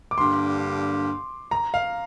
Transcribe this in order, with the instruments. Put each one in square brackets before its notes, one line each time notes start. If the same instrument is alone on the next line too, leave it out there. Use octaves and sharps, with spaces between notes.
[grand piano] D6
[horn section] G2 D3 A#3 G4 [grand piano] C6
[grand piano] A#5
F5